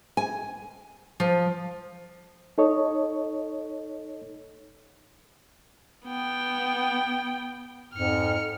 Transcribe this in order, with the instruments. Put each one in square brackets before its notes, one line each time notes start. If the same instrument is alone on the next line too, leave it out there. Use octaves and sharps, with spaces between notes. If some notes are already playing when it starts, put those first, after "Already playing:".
[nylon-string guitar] G#5
F3
[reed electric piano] D#4 A4 C#5 D#5
[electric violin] B3 G5
[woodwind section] F2 G#2 [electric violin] F6 C#7